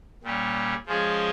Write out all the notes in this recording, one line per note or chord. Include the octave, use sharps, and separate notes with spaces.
A#2 G3 C#4
F3 G#3 C#4 F4 G#4